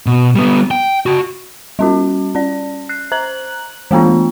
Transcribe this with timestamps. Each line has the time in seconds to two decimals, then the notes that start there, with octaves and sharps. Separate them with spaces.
0.07 B2
0.36 G3 B3
0.71 G5
1.06 F#4 A5
1.79 G3 C#4 F#4
2.35 C#4 D5
2.89 F#6 C7
3.12 C5 A#5 F#6 F#7
3.91 E3 A3 B3 D4 F4